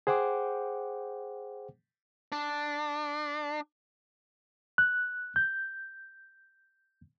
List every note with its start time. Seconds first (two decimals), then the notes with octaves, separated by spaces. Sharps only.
0.07 G#4 C5 F#5 G5 D6
2.32 D4
4.78 F#6
5.36 G6